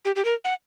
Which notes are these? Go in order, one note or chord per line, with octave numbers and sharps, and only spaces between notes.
G4
G4
A#4
F#5